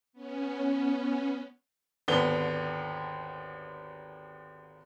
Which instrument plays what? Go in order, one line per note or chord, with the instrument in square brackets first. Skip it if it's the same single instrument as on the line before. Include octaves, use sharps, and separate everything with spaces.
[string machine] B3 C#4
[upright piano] G#1 D#2 D3 B3 G7